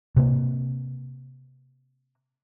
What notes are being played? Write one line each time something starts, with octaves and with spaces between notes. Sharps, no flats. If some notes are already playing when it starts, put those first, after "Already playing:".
C3 A#3